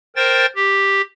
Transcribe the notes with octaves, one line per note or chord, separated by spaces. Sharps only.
A#4 C5 G5 A6
G4